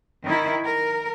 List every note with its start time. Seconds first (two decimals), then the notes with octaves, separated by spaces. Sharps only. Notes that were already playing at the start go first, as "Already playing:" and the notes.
0.24 D#3 E4
0.65 A#4